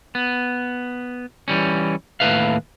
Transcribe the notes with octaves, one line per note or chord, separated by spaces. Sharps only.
B3
E3 G3 C#4
D#2 A2 B4 E5 F5